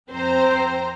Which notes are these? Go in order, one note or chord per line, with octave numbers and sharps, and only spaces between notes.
F2 C4 C5 A#5